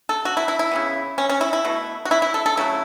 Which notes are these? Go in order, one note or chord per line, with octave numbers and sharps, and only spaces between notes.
A4
F#4
E4
E4
E4
C#3 E3 B3
C#4
C#4
E4
E4
B2 A3
F#4
E4
E4
A4
A4
C#3 F#3 A3 E4